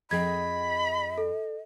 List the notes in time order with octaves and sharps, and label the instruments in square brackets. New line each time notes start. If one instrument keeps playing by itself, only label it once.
[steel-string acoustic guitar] F2 G#4 G5 [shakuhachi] D#5 [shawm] B5 [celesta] G#6
[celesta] A4